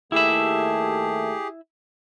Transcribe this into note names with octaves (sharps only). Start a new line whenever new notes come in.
D#2 A3 E4 G4 G#4 E5